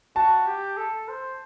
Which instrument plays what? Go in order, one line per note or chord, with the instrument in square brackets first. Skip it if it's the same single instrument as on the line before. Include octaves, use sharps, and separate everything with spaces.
[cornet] F#4 [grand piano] A5
[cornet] G4
A4
C5